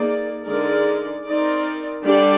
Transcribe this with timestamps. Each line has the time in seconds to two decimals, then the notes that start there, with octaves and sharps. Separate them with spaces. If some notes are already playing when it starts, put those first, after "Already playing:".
Already playing: A#3 D#4 G#4 D5
0.46 D3 G#3 D#4 A#4 D5
1.24 C4 D#4 A#4 D5
2.03 D3 G3 D4 G4 D5